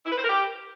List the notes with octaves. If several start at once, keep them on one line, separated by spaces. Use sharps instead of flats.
E4
B4
C5
A#4
G4